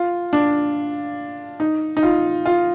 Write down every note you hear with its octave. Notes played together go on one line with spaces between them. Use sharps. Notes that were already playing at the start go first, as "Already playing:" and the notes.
Already playing: F4
D4
D#4
D#4
F4
F4